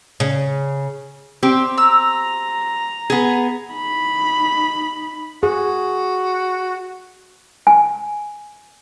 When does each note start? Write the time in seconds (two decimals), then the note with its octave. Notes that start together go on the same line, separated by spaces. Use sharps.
0.20 C#3
1.43 C4 G4
1.78 A#5 E6
3.10 B3 G#4
3.74 D#4 B5
5.43 F#4 G#4
7.67 G#5